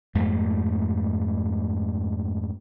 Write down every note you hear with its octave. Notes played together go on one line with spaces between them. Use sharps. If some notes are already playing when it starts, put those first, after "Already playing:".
F2 G#2 A3 A#3